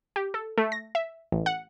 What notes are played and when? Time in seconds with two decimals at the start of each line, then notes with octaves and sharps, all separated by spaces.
0.16 G4
0.34 A4
0.57 A3
0.72 A#6
0.95 E5
1.32 A1
1.46 F#5